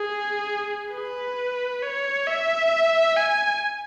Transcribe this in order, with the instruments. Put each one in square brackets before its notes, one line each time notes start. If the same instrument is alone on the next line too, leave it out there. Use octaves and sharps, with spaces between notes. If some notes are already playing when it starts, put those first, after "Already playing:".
Already playing: [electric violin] G#4
B4
C#5
E5
G#5